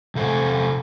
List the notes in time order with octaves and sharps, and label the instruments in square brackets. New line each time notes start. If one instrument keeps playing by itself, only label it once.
[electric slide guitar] C3 A4 C5